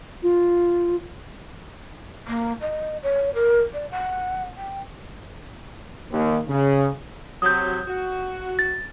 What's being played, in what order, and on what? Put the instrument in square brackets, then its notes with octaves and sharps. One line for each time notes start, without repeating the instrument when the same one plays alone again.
[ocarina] F4
[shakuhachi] A#3
D#5
C#5
A#4
D5
F#5
G5
[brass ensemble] D#2
C#3
[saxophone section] C3 F#3 [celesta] D#6 G6
[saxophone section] F#4
[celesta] A6